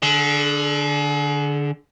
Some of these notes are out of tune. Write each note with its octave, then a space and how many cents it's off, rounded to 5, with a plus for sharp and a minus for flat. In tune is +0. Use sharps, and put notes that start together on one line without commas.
D3 +0 G#4 +40